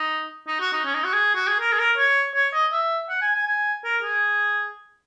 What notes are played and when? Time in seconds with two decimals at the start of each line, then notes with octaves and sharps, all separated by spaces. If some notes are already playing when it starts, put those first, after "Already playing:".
Already playing: D#4
0.48 D#4
0.60 F#4
0.73 D#4
0.85 C#4
0.94 D#4
1.04 F#4
1.13 G#4
1.35 F#4
1.47 G#4
1.60 A#4
1.72 G#4
1.79 A#4
1.97 C#5
2.34 C#5
2.53 D#5
2.72 E5
3.09 F#5
3.22 G#5
3.35 G#5
3.47 G#5
3.84 A#4
4.03 G#4